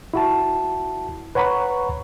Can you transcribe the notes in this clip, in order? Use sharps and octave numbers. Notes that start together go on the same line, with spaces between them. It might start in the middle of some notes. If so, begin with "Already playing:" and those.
E4 F#4 A5
B4 C#5 F#5 A#5 B5 C#6